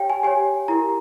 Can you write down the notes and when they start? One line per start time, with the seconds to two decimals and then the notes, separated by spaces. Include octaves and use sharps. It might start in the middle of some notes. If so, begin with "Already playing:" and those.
Already playing: G4 C#5 F5 G5
0.10 G#5
0.23 G4 C#5 G#5
0.68 E4 G4 A#4 A#5